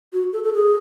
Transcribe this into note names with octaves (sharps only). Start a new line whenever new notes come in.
F#4
A4
A4
G#4